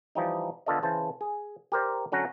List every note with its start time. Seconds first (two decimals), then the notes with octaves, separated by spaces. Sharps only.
0.15 E3 F3 G3 D#4
0.66 D3 B3 F4 A4 D5 D#5
0.83 C#3 E3 C5 A5
1.21 G#4
1.72 G4 A#4 C5 D5
2.12 D3 F#3 C#4 F#5 A#5